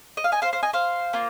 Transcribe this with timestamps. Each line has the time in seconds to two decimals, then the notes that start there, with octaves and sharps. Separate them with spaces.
0.17 D#5
0.24 F5
0.32 D#5 G#5
0.42 C5 F5
0.53 C5 F5
0.63 D#5 G#5
0.73 C5 F5
1.13 A#3 F4